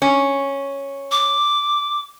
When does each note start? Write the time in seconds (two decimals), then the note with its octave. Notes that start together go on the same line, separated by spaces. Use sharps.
0.02 C#4
1.11 D6